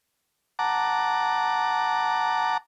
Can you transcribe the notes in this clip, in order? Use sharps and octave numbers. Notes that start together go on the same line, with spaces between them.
F#5 A5 A#5 D6